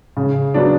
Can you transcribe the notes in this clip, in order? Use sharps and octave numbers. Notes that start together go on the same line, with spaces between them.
C#3
F#3 B3 D4